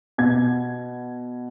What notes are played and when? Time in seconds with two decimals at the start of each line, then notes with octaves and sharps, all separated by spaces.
0.18 B2 G#6